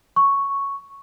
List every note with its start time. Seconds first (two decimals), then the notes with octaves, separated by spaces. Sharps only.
0.16 C#6